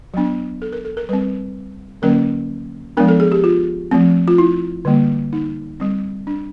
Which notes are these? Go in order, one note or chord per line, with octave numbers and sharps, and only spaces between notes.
F#3 B3 D4
A4
A#4
A4
A#4
G3 C4 B4
D3 F#3 A#3 C#4 A#4
F3 G#3 B3 D4 A#4
A4
G#4
G4
F4
F3 A3 C4
F4
E4
D3 G3 A#3
D#4
G3 C4
D4